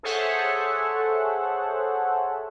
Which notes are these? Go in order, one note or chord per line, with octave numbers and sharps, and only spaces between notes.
G#4 A4 C5 C#5 E5 F#5